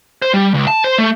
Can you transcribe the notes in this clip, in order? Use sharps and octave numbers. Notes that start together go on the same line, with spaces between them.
C5
G3
C#2
A5
C5
A3